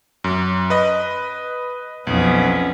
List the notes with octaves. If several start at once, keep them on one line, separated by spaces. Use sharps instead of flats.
F#2
B4 D#5
B1 F2 B3 C#4